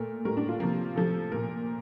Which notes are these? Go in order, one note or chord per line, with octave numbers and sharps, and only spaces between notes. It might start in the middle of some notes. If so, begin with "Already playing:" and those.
Already playing: A#2 A3 A#4
A2 G3 A#3 A#4
D4
F4
C3 F3 A#3
C3 F3 A3 A4
A#2 F3 A#3 A#4